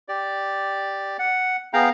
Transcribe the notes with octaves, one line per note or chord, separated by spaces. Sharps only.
G4 D5
F#5
B3 G#4 F5 G5 A#5